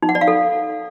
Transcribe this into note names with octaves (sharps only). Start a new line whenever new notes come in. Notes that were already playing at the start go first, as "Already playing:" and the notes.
D#4
F#5
D5
F5
A4